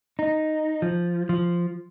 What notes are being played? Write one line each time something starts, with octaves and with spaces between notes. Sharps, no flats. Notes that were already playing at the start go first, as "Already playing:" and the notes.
D#4
F3
F3